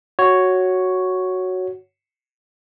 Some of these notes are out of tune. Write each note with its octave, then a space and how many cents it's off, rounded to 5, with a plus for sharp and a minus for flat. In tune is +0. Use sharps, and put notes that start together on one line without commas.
F#4 +0 C#5 +0